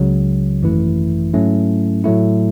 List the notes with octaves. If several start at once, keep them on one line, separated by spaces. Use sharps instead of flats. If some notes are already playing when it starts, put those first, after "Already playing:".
Already playing: C#2 C#3 F#3
G#1 F#2 E3 A3 E4
G#2 F#3 A3 C#4 E4
A2 F#3 A3 E4